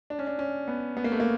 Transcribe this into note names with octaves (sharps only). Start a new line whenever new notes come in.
D4
C#4
D4
C#4
B3
B3
A#3
A3
A#3